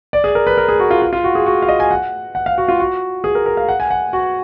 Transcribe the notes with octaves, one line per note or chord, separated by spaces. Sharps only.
D5
G#4
A#4
B4
A#4
G#4
F#4
F4
F4
F4
F#4
G#4
F#4
F5
D#5
G#5
F#5
F#5
F5
F#4
F4
F#4
G#4
A#4
A#4
F5
F#5
G#5
F#5
F#4